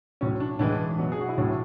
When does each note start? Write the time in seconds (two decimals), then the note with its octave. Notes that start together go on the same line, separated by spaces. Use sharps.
0.21 A2 F#3 C#4
0.40 D4
0.59 A2 E3 G#3 D4
0.98 B2 F#3
1.12 G#4
1.20 F#4
1.29 E4
1.38 A2 F#3 D4